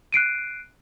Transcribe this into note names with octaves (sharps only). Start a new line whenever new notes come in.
F#6 C7 D7 D#7